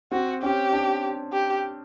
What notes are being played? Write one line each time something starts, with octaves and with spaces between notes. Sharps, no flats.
C4 F#4
C#4 G4
D4
G4